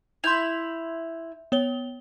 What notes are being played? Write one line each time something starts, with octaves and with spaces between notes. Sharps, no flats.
E4 C6 G6 F7
B3 C#5 G7